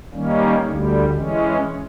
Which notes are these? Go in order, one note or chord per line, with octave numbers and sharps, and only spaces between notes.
D#3 G3 A#3 C#4
D2 D3 G3
E3 G#3 C#4